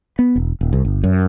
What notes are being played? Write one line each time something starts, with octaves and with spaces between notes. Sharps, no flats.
B3
E1
D#1
C2
G1
F#2